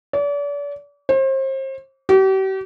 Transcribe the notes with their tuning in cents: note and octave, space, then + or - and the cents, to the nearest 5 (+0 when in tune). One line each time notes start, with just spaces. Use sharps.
D5 -40
C5 +35
G4 -40